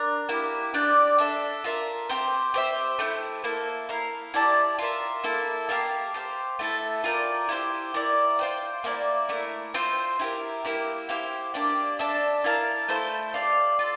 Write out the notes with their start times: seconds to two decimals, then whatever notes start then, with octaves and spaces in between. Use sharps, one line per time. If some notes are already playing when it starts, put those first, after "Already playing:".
Already playing: D4 A#4
0.29 A#3 E4 G4
0.74 D4 G4 D5 G5
1.18 D4 A4 E5
1.64 F4 A#4 E5
2.09 C4 G4 C5
2.54 G4 C5 E5
2.99 A3 C4 E4
3.44 A#3 E4 A4
3.89 E4 A#4 F5
4.34 E4 G4 D5 A5
4.79 F4 A#4 E5
5.24 A#3 E4 A4
5.69 G4 A#4 F5 A5
6.14 G4 C5 F5
6.59 A3 E4 A4
7.04 F4 A#4 D5 G5
7.49 E4 G4 C5
7.94 E4 A#4 D5
8.39 F4 C5 G5
8.84 A#3 E4 A4 D5
9.29 A3 E4 A#4
9.74 C4 F4 C5
10.19 E4 G4 A#4
10.65 A#3 E4 G4
11.09 E4 G4 C5 F5
11.54 A#3 D4 G4 D5
11.99 D4 A4 E5
12.44 E4 A#4 F5 A5
12.88 A3 E4 A4 C5
13.34 G4 D5 F5
13.79 F4 A4